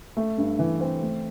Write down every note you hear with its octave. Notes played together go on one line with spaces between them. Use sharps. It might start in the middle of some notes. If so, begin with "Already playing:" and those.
A3
G2
E3
C4
A3